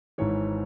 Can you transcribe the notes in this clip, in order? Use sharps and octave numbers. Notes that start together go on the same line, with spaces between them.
G#1 G#2 E3 C#5